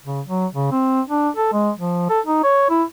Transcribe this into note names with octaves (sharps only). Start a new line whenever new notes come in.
C#3
F#3
C#3
C4
D4
A4
G#3
F3
A4
D#4
C#5
E4